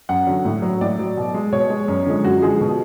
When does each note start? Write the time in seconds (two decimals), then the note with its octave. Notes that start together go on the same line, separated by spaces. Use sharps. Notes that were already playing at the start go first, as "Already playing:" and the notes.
0.09 F#2 F#5
0.27 D3 F#3
0.45 A2
0.62 F#3
0.81 A2 D5
0.99 F#3
1.17 B2
1.34 G#3
1.53 B2 C#5
1.70 G#3
1.88 F#2
2.07 D3 F3 G#3
2.24 F#2 F#4
2.42 D3 F3 G#3 G#4
2.61 B2